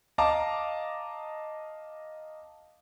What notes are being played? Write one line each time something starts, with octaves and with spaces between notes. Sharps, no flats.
D#5 F5 A5 A#5 D6